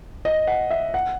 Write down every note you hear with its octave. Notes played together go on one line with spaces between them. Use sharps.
D#5
F#5
E5
F#5